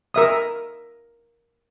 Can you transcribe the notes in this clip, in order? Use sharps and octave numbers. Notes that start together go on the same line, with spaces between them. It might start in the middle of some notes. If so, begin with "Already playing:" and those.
A#4 E5 D#6